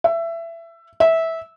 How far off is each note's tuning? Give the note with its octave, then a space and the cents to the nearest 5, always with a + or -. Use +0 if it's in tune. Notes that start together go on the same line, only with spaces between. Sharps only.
E5 +20
E5 -15